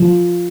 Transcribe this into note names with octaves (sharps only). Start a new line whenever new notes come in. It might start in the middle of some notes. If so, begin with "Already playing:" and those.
Already playing: F3